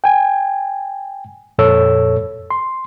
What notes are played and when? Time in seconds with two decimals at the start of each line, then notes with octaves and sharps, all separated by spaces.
0.04 G5 G#5
1.58 F2 A#2 A4 C#5 E6
2.50 C6